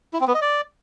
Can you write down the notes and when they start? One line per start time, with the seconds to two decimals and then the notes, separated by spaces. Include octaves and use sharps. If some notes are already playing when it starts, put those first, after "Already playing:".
0.13 E4
0.20 C4
0.27 B3
0.34 D#5
0.41 D5